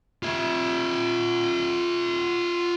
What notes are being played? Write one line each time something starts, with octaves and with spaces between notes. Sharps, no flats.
F4 E5